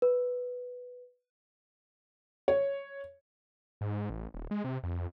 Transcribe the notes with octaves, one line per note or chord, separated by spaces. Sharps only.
B4
C#5
G#2
A1
D#1
G#3
C3
F2